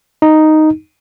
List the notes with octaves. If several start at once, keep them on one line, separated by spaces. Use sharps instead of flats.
D#4